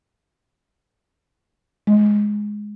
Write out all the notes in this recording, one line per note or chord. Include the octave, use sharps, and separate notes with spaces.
G#3